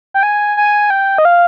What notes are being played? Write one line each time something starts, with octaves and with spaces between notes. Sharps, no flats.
G5
G#5
G#5
G5
D#5
F5